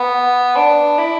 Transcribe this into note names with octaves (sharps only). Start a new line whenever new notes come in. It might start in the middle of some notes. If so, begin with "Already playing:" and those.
Already playing: B3
D4
E4